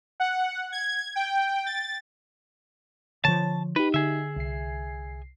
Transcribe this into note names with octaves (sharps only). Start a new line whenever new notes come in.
F#5
G#6
G5
A6
D3 D#3 F3 C#5 A5
D#4 G4 B4
D3 G#4 E5
C2 C7